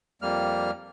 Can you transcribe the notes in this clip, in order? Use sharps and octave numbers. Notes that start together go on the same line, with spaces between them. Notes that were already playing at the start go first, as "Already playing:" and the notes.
F2 G3 A#3 F6